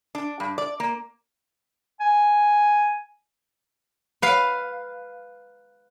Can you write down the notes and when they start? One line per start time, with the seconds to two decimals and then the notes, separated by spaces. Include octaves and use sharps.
0.15 D4
0.40 G2
0.58 D5
0.80 A#3
2.00 G#5
4.22 B4 F5